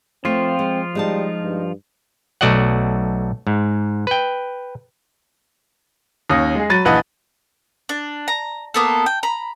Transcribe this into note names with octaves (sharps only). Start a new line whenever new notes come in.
F3 A3 C4 F4 C#5
G#3
G3 G#3 D#4 A5
G2
B1 A3 F#4 D5 D#5 F#5
G#2
B4 G5
D#2 C#4 D#6 A#6
G#3 G#4
F#3 B5 A6 D#7
A#1 E3 B4 D#5 F#5 A5
D4
A#5
A#3 B3 A4
G5
A#5 B5